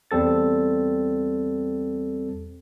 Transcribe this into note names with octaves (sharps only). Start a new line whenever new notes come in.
E2 G3 C4 A4 A6